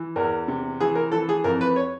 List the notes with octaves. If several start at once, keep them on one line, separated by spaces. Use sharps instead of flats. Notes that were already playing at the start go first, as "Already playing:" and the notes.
Already playing: E3
E2 A#4
C3
E3 G#4
A#4
E3 A4
G#4
F2 A#4
B4
C#5